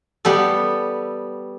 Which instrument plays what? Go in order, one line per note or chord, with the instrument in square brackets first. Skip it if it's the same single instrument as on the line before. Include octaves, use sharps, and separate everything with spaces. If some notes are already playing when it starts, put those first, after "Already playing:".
[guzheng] G3 B3 A4